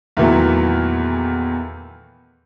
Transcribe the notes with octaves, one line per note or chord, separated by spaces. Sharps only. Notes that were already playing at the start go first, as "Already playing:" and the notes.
E2 A#2 D#3 E3 F#3 A3